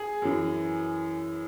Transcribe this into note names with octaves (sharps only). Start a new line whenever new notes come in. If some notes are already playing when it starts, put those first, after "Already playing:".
Already playing: G#4
F#2 E3